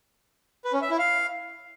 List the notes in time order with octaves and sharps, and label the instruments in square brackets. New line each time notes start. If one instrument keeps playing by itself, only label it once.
[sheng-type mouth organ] B4
C#4
E5
E4
F5